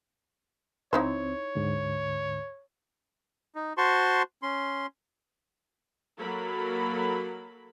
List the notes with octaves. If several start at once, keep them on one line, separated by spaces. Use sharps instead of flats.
C#2 C4 D#4 E4 C5 C#5
D2 G#2 D3
D#4
F#4 C5 A5 C6 C#6
C#4 C6
F#3 A#3 A4 A#4 B5